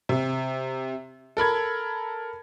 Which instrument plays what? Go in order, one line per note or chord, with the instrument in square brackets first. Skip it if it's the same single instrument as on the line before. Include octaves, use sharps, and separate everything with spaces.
[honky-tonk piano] C3
A4 A#4 B5 G#6